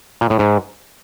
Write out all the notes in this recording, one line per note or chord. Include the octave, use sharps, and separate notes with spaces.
A#2
A2
G#2